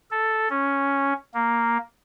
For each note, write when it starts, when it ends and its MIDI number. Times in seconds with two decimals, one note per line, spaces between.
0.11 0.48 69
0.50 1.13 61
1.34 1.78 58